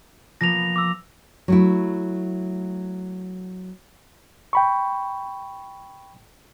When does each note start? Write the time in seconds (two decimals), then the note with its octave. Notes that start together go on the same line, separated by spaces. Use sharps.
0.41 F3 A#3 B3 A#6 F7
0.76 D6 E6
1.48 F#3 A3 E4
4.53 G5 B5 C#6